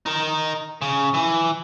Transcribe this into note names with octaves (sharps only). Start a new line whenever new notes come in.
D#4 A#4
C#3
E3